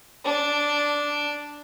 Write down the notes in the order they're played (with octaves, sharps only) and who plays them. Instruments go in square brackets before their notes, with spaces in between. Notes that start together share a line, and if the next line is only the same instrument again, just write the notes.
[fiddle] D4